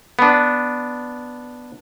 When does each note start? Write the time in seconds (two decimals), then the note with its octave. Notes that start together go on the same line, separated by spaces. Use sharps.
0.19 B3 D4